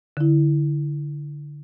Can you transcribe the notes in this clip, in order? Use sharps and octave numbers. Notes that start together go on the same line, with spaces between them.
D3 E4